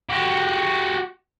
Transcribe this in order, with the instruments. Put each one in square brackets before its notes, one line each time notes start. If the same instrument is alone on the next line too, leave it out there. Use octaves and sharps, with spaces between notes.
[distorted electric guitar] F#4 G4